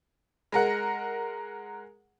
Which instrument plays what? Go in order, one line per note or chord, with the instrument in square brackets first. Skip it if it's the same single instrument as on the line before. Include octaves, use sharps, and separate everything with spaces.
[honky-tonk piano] G#3 A#4 F#5